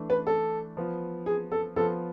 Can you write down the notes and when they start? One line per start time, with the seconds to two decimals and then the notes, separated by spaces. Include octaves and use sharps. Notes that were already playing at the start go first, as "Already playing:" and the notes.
Already playing: E3 A3 D4
0.10 B4
0.27 A4
0.77 F3 B3 F4
1.26 G#4
1.52 A4
1.76 F3 B3 F4 A4